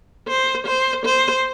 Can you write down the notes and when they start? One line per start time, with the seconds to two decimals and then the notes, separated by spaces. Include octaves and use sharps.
0.28 C5
0.67 C5
1.06 C5